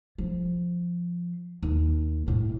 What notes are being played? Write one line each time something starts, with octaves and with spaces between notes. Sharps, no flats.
F3
D#2
A2 C4